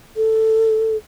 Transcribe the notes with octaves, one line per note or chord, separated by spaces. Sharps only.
A4